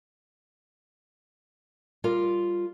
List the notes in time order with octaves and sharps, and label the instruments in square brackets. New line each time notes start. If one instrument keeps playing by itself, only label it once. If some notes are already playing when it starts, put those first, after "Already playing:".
[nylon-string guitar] G3 F4 A#4 F5